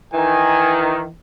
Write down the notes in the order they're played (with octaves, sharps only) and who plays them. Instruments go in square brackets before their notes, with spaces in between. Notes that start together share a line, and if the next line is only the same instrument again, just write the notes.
[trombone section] D#3 [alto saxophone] E3 [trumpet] G#5